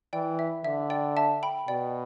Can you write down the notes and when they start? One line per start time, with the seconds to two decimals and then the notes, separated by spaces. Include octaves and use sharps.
0.13 E3 D5 G5
0.39 E5
0.65 D3 E5
0.90 D5 G5
1.17 E5 A5
1.43 G5 B5
1.68 B2 D5 G5